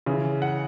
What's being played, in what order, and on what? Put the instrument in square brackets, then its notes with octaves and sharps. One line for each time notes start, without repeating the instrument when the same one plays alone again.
[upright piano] C#3 E3
F#5